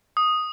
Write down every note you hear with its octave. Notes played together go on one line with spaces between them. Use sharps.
D#6